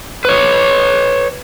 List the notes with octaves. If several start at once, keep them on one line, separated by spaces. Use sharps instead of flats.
B4 C#5